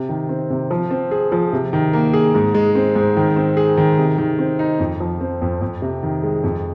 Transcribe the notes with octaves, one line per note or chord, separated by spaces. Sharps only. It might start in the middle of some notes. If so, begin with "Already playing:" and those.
Already playing: C3
D#3
C4
C3
F3
C4
G#4
F3
C3
D#3
A#3
G#4
G#2
G#3
C4
G#2
D#3
C4
G#4
D#3
C3
D#3
C4
D#4
F2
F3
C4
F2
F2
C3
D#3
G#3
F2